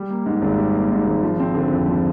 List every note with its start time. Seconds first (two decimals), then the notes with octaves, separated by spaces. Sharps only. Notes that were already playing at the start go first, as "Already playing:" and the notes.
Already playing: G3
0.10 A#3
0.26 G#2
0.42 G#1
0.58 G3
0.74 A#3
0.91 G#2
1.07 G#1
1.23 F3
1.40 C4
1.55 D3
1.71 F2
1.88 F3